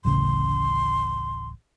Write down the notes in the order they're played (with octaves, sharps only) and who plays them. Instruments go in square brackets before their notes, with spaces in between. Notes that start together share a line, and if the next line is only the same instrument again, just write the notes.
[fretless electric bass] D1 A1 C#3 [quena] C6